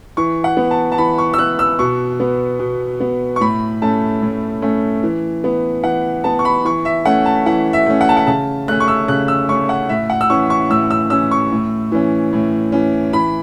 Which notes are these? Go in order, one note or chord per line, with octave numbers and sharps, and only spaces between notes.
E3 C#6
F#5
B3
A5
A5
E3 B5
C#6
E6
B3 F#6
E6
B2 C#6
B3
B2
B3
C#6
A2 B5
A3 C#4 A5
A2
A3 C#4
E3
B3
E3 F#5
B3 A5
C#6
B5
E3 C#6
E5
A3 C#4 F#5
A5
E3 F#5
E5
A3 C#4
F#5
A5
F#5
C#3 A5
A3 C#4 F#6
C#6
E6
C#3 F#6
E6
A3 C#4 C#6
F#5
A2 E5
F#5
E6
E3 C#4 C#6
C#6
A2 E6
E6
E3 C#4 E6
C#6
A2
E3 C#4
A2
E3 C#4
E3 B5